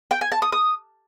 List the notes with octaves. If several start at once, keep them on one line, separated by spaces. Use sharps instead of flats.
G5
G#5
A5
D#6
D#6